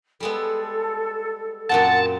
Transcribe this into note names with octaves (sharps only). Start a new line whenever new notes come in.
G3 G#3 B3 A4
F#2 A#2 C4 F#5 A5